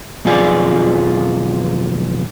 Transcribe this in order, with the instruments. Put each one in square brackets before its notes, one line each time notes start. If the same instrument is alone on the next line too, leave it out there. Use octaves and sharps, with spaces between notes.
[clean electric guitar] B1 F2 F3 F4 G#4 D5